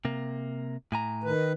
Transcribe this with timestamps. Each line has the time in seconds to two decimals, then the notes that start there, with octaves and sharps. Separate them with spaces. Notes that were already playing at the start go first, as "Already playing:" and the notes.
0.05 C3 A#3
0.92 A2 G#5 A#5
1.24 D#3 B4